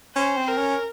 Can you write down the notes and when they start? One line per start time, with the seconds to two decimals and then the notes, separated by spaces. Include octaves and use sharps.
0.16 C#4 C5
0.37 C4
0.48 A#4
0.58 C#4